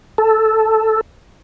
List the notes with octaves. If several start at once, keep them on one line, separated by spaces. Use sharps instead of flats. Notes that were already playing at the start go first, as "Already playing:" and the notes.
A4